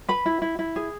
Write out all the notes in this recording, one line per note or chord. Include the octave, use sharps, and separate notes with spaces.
B4 B5
E4
E4
E4
G#4